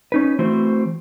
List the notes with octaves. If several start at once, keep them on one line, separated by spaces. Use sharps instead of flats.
C#4 D#4 B4
E3 A3 C4 F#4 C5